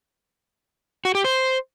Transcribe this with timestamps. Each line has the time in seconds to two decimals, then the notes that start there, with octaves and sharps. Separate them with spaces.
1.05 F#4
1.15 G4
1.24 C5